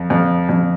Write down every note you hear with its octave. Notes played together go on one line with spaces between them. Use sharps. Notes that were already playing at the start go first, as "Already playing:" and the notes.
Already playing: F2
F2
F2